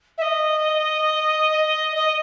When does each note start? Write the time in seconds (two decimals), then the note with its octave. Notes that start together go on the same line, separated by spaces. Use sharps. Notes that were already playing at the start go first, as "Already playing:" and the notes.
0.18 E5
0.22 D#5
1.96 D#5